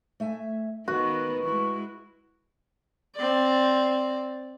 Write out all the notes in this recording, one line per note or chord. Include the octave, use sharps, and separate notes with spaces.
A3 E5 G#5
D#3 B3 F#4 B4
G#3 E4
C4 D5